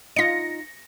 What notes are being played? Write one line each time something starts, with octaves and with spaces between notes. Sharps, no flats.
D#4 F4 A#6 C#7